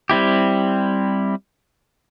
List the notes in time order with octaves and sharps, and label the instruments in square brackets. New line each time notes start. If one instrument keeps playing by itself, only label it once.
[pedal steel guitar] G3 C4 E4 G4